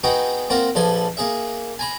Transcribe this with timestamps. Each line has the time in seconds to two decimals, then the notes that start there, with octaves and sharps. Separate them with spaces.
0.03 B3 D#4 F#4 G#4 G5
0.50 A#3 C4 F4 F#4 A#4
0.75 A#1 F3 A4 B4 G#5 B5
1.17 A#3 G#4 E5
1.79 G#5 A#5 B5